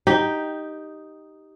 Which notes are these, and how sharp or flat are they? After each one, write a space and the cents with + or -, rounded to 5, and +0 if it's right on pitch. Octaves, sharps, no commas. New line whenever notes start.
D#4 +0 G4 +0